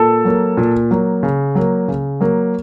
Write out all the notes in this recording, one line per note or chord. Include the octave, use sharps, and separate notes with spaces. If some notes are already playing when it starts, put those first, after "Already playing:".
Already playing: A#2 A4 A5
F#3 A#3
A#2
F#3 A#3
C#3
F#3 A#3
C#3
F#3 A#3